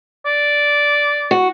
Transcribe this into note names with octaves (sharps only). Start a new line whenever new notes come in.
D5
F#4